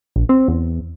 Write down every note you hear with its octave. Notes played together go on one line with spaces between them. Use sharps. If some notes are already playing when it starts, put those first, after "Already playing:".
A#1
C4
E2